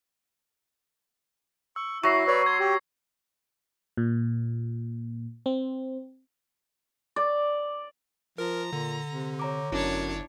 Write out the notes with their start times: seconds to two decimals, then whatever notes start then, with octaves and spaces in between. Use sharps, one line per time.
1.76 C#6 E6
2.03 F#3 E4 C#6 A#6 C7
2.27 B4 C#5 D5
2.46 C6 G#6
2.60 G4
3.97 A#2
5.46 C4
7.16 D5
8.38 F3 A#4 A#5
8.73 A#2 D3
9.09 C3
9.39 C#5 A#5 D6
9.72 G1 F#2 D4 E4 C#5